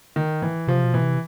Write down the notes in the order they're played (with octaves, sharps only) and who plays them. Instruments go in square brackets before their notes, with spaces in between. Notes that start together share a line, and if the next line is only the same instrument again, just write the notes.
[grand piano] D#3
E3
[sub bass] C3 [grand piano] F3
[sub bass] B2
[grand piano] E3
[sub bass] C3